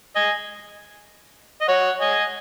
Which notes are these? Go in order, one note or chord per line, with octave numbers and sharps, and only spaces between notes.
D#5 G#5
D#5
C#5 F#5
D#5 G#5